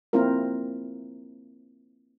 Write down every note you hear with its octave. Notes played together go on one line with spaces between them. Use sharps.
A#3 C4 E4 F4 A#4